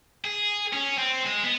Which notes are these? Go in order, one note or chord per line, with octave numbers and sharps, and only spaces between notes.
G#4
C#4
C4
G#3
B3